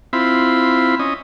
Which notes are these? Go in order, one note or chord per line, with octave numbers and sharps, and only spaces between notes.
C4 E4 F4 B5
C#4 D#5